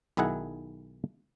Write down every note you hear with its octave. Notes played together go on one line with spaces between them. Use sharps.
B1 D#3 E4 G#4 F#5